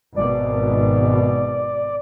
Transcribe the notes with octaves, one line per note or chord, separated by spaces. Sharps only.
G#1 B2 D5